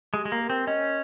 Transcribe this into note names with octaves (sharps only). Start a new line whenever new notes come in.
G#3 G4
G#3
A#3
A#4
C4
C#4 D#5